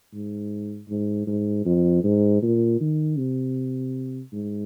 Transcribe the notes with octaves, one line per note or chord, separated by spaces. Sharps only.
G#2
G#2
G#2
F2
G#2
A#2
D#3
C3
G#2